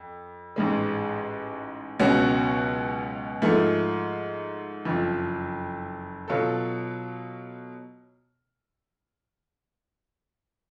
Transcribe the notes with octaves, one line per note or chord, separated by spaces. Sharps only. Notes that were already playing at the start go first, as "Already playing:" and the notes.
Already playing: F2
A1 G#2 G#3
C#2 B2 F#3 C#4 F#4
G#2 F3 A3
F#1 F2 F3
B2 F#3 B3 F4 A4